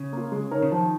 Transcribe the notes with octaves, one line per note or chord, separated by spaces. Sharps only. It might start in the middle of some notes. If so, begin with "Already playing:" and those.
Already playing: C#3
A#3 F4
G#3
D#4 A#4 C#5
C#3
D#3 F3